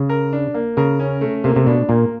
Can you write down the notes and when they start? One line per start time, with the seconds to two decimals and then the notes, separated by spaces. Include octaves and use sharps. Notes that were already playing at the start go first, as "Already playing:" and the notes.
Already playing: C#3
0.10 A#4
0.33 D4
0.54 A#3
0.77 C#3 A#4
1.00 C#4
1.21 A3
1.44 C3 A#3
1.56 C3
1.67 B2 D4
1.89 A#2 A#3